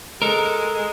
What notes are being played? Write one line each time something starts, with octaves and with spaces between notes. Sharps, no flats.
G#3 A4 A#4